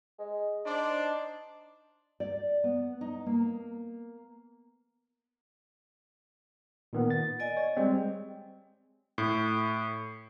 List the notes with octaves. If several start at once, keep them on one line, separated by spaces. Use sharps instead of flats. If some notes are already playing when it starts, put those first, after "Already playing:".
G#3
D4 D#4 C5 D5
D5
B3
D#4
A#3
A#2 D#3 B3
A6
D5 D#5 G#5
C#5
G3 G#3 C4
A2